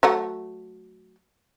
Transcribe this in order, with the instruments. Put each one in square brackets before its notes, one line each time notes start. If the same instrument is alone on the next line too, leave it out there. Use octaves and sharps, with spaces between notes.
[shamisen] F#3 A3 F#5